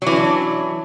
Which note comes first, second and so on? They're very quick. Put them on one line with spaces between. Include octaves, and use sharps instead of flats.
F#3 E3 C#4 D4